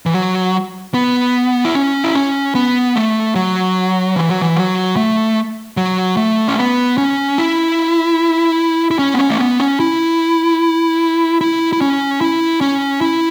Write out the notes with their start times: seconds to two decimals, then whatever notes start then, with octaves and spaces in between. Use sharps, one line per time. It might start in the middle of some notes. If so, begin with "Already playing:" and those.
0.06 E3
0.14 F#3
0.94 B3
1.65 E4
1.75 C#4
2.04 E4
2.15 C#4
2.55 B3
2.96 A3
3.35 F#3
4.16 E3
4.29 F#3
4.42 E3
4.56 F#3
4.96 A3
5.77 F#3
6.17 A3
6.48 C#4
6.57 B3
6.98 C#4
7.38 E4
8.91 E4
8.99 C#4
9.14 B3
9.19 C#4
9.30 A3
9.40 B3
9.60 C#4
9.80 E4
11.41 E4
11.73 E4
11.81 C#4
12.21 E4
12.61 C#4
13.01 E4